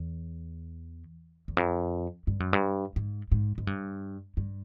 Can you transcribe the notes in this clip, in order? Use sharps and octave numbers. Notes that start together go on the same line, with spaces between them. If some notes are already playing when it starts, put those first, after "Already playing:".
Already playing: E2
E2
F2
G2
F#2
G2
G#2
G#2
G#2
G2
G2